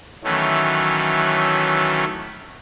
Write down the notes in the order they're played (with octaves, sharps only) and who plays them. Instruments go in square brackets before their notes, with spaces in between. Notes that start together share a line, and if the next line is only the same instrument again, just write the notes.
[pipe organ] D#3 E3 F#3 A3 C#4